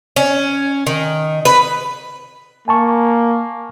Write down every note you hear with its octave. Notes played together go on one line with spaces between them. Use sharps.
C#4
D#3
B4
A#3 G#5 A5 C#6